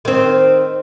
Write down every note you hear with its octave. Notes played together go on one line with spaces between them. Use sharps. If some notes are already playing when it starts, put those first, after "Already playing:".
D#3 C4